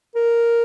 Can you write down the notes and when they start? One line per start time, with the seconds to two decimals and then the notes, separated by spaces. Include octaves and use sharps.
0.15 A#4